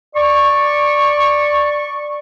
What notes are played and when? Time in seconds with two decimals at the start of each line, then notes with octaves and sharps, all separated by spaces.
0.16 D5 C#6